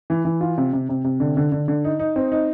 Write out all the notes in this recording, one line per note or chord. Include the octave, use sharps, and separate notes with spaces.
E3
E3
F4
C3
C3
C3
C3
D3
D3
D3
D3
D#4
D#4
C4
D#4